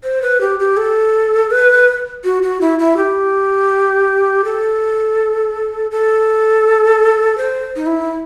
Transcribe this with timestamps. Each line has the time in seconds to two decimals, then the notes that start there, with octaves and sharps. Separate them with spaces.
0.04 C5
0.22 B4
0.41 G4
0.59 G4
0.77 A4
1.51 B4
2.24 F#4
2.43 F#4
2.61 E4
2.79 E4
2.97 G4
4.44 A4
5.91 A4
7.38 C5
7.76 D#4
7.86 E4